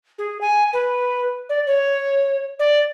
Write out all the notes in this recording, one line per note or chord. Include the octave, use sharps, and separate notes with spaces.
G#4
G#5
B4
D5
C#5
D5